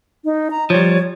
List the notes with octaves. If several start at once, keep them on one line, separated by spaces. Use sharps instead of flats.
D#4
A#5
F3 G3 C#5